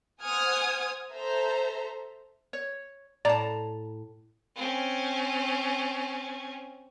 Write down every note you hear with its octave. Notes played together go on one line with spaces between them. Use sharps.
C5 F#5 G#5 D#6 F6 G#6
A4 C5 E5 A#5
C#5
A2 D5 A5 A#5
C4 C#4